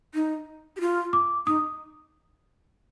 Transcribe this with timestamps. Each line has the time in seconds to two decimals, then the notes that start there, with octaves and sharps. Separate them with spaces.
0.14 D#4
0.76 G4
0.80 F4
1.13 D6
1.47 D#4 D#6